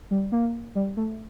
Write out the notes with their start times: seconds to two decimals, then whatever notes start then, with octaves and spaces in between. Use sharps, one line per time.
0.11 G3
0.32 A#3
0.75 G3
0.97 A3